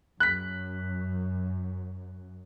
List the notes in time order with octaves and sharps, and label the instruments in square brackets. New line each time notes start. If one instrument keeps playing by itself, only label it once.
[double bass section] F#2 [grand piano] F#6 B6